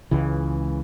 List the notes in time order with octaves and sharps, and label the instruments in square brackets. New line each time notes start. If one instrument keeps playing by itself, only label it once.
[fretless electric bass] C#2 C#3 E3